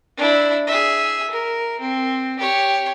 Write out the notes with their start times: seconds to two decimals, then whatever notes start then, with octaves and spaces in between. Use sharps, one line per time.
0.17 D4 E4
0.67 G#4 E5
1.30 A#4
1.80 C4
2.39 G4 C#5